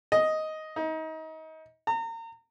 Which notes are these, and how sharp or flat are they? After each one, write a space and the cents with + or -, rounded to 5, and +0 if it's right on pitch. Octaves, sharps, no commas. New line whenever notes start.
D#5 +5
D#4 +30
A#5 -35